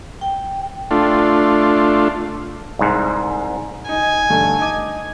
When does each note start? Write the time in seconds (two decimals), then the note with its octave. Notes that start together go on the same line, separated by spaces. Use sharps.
0.21 G5
0.91 A3 D4 F4
2.79 C2 G#2
3.89 D#4 G#5
4.30 G2 D3 A3
4.59 D#4 D6